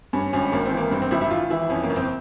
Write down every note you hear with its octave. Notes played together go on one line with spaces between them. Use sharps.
G2 C#4
G#1 C#4
G#1 A#3
C4
E3
A#3
G2 C4
C4
G#1 E4
E4
G#1 F4
E3 E4
F2 C#4
A#3
G1
C4